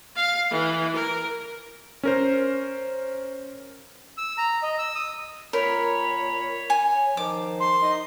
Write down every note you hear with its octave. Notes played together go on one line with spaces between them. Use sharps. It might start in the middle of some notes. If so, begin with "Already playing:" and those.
F5
E3
A#4
C#4 A#4 C5
E6
A#5
D#5
E6
D#6
A#2 A#4 C#5 B5
G#5
D#3 F3 D6
C6
D#4 D#5